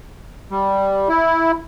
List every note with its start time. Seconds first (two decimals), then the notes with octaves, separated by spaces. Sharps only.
0.51 G3
1.09 E4